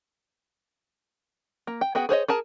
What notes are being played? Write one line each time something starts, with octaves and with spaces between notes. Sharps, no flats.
A#3
G5
B3 F#4 G#4 G5
G#4 C5 C#5 D#5
G#4 A#4 A5